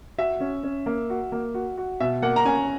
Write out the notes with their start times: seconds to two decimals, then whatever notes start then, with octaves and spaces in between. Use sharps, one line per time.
0.18 F#4 E5
0.40 C#4
0.63 C#4
0.86 A#3
1.10 F#4
1.32 A#3
1.54 F#4
1.77 F#4
2.00 B2 E5
2.22 A#3 F#5
2.36 A#5
2.45 C#4 G#5